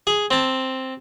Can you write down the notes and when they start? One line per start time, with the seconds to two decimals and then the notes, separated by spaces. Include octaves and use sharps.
0.07 G#4
0.31 C4 A5